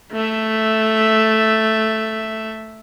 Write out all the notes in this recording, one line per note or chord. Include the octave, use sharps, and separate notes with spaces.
A3 E5